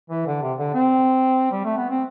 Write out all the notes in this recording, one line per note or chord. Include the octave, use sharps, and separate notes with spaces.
E3
D3
C3
D3
C4
G3
A3
B3
C4